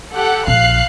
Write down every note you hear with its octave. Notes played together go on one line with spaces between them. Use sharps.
G4 A4 F#5
A#1 A#2 F5 F#6 C7